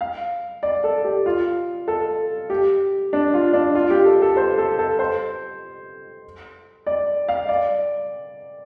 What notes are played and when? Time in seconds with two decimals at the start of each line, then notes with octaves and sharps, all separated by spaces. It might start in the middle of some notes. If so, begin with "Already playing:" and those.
0.01 F5
0.63 D5
0.84 A4
1.04 G4
1.26 F4
1.88 A4
2.50 G4
3.13 D4
3.34 F4
3.53 D4
3.75 F4
3.90 G4
4.05 A4
4.22 A4
4.37 C5
4.58 A4
4.79 A4
4.99 C5
6.87 D5
7.29 F5
7.49 D5